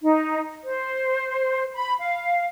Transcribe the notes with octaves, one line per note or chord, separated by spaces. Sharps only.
D#4
C5
B5
F5